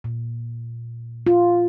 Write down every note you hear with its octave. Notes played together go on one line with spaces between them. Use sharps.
A#2
F4